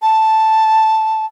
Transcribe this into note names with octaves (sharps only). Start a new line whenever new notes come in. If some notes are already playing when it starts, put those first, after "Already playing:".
A5